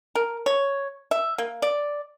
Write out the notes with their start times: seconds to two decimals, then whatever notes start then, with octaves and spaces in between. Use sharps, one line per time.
0.15 A#4
0.46 C#5
1.11 E5
1.38 A#3
1.62 D5